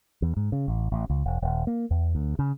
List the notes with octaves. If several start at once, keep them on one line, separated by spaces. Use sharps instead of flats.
E2
G#2
C#3
A1
A1
C#2
E1
D#1
A#3
E2
D2
C#3